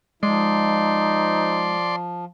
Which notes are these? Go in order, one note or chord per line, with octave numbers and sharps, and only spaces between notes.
F3 G#3 D#4 D5 C6